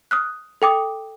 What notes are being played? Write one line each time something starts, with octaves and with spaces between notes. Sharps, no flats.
D#6 F6 F#6
A4 G5 D6 D#6